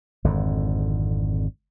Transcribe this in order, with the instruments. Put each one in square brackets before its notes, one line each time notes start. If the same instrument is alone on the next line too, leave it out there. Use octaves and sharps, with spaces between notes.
[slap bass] G#1 F2 D3